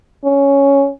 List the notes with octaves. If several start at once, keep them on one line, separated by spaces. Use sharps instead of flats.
C#4